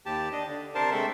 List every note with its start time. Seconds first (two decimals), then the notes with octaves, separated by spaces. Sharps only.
0.06 D#2 G4 A5
0.32 D4 D#5
0.48 D3
0.75 C3 D4 A#4 C5 A5
0.92 G#3 A3 C4 A4 E5